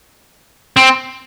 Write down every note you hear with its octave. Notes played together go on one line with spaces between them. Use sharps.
C4